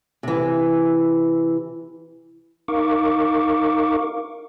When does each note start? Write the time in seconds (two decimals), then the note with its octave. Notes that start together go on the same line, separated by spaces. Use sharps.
0.23 C3 E3
2.68 D#4 A#4 F5 C#6 D6